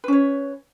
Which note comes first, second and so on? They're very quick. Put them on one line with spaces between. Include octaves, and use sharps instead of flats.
B4 C#4 C#5